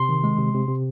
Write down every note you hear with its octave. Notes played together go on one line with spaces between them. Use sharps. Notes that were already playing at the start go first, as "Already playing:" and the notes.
Already playing: C3 C6
D#3
G#3
C3
C3
C3